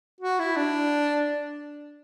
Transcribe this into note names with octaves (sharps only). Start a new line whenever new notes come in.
F#4
E4
D4